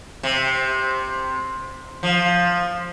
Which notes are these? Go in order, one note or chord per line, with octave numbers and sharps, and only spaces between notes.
C3
F3